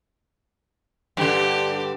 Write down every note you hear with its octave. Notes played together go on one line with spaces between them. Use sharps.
G2 D3 G4